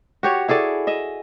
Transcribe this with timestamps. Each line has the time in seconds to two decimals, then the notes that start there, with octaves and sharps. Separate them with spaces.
0.23 F#4 G4 C#5
0.48 E4 G#4 A4 D5
0.87 D#5 E5